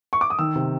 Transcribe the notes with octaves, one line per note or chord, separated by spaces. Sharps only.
C#6
D6
D#6
D#3 E6
C3